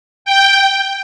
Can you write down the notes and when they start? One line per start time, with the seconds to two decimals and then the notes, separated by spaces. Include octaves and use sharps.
0.25 G5